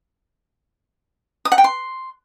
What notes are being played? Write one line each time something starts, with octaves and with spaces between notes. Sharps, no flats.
D#6
F#5
G5
C6